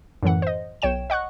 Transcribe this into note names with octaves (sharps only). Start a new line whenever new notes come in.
F#2 A2 E3 F#5
C5 D#5
B1 C#5 G5 E7
D#5 F#5 C#6 F#6